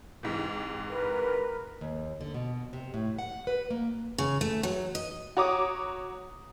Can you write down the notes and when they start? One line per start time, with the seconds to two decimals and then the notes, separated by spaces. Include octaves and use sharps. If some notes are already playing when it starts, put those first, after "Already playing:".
0.23 G#2 C3 E3
0.90 A#4 B4
1.81 D#2
2.21 D3
2.34 B2
2.73 C3
2.94 A2
3.19 F#5
3.47 B4
3.70 A#3
4.18 C#3
4.41 A3
4.63 F#3
4.95 D#5
5.37 F#4 C#5 A#5 D6 D#6